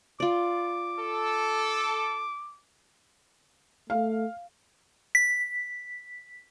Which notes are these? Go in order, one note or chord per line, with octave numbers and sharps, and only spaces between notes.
F4 D5 D6
A4
A3 F5
B6